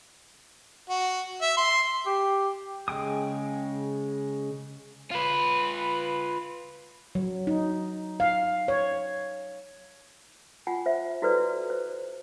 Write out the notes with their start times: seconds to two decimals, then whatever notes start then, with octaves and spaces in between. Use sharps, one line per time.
0.89 F#4
1.41 E5
1.57 C6
2.06 G4
2.88 C#3 G#3 G5 D#6
5.11 F4 B4
7.15 F#3
7.47 D#4
8.20 F5
8.68 C#5
10.67 F4 F#5 G#5
10.86 C5 E5
11.22 E4 F#4 A4 B4 C5 D5
11.70 C5